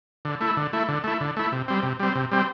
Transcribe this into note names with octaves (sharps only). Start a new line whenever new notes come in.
D3
A3 E4
D3
A3 E4
D3
A3 E4
D3
A3 E4
C3
G3 C4
C3
G3 C4
C3
G3 C4